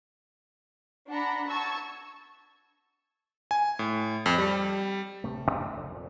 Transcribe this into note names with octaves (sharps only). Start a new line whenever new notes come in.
D4 F#5 A#5 B5
A5 C#6 E6 G#6
G#5
A2
F2
G3
D1 C3 A3
F#2 A3 D4
F1 D3
F2 A#2